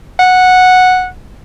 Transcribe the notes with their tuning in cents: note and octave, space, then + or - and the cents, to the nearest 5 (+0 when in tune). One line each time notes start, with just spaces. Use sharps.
F#5 -10